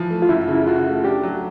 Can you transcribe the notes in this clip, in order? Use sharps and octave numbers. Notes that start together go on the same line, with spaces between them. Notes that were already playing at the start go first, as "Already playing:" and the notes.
Already playing: E3 F3
A3
F4
F#2 E4
C#3
E4
F4 F#4
A3
D4 G4
F#3